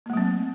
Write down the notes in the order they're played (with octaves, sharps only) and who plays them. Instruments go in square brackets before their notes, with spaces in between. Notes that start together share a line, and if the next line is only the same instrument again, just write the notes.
[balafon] A#3
A3
F#3
C4